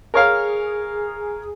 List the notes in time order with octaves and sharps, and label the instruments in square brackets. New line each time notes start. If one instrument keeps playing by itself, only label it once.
[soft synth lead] G#4 [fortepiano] A#4 C#5 F5